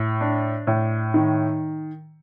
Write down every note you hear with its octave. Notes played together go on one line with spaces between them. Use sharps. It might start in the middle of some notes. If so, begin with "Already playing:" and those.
Already playing: A2
D4
A2
D#3